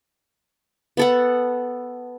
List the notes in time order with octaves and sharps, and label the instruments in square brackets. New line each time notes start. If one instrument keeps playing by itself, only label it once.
[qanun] B3 A4 F#5